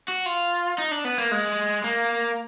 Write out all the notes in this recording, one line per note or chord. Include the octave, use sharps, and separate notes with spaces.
F#4
F4
D#4
D4
B3
A#3
G#3
A#3